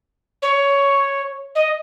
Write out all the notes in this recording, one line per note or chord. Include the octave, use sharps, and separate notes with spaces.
C#5
D#5